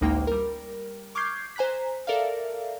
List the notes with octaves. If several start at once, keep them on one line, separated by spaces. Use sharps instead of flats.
A1 D2 G#3 A#3 D#4 G5
G3 A#4
C#6 D6 F6 G6 G#6 C7
C5 G#5 A#5 F#6 B6
A4 A#4 D5 E5 F5